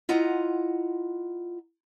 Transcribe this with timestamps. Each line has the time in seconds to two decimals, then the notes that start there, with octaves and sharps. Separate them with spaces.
0.09 E4 F4 D#5 F#5 A#5